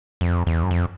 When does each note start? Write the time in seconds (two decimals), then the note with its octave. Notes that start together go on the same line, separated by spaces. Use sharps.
0.21 F2
0.47 E2
0.63 F#2
0.71 F2